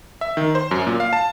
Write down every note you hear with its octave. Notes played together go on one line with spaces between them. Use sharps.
E5
D#3
C5
F#2
A#2
F5
A5